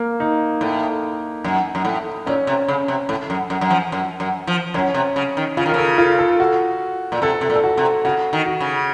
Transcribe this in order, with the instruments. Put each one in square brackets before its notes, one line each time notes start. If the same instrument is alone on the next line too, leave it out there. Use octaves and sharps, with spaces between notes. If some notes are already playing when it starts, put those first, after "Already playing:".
Already playing: [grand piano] A#3
D#4
[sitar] A2
F#2
F#2
A2
[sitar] A#2 [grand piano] C#4
[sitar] C3
C#3
C3
A2
F#2
F#2
F#2
F3
F#2
F#2
F3
[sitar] F#2 [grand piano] C#4
[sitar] C3
C#3
D#3
[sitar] C#3 [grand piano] F4
[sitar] D#3
[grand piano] A#4
[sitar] C#3 [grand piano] A4
[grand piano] F4
A4
F#4
[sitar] A#2
[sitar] C3 [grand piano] A4
[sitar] C3
A#2
[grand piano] A4
F#4
[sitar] C3
[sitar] C#3 [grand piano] F#4
[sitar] D#3
[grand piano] F#4
[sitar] C#3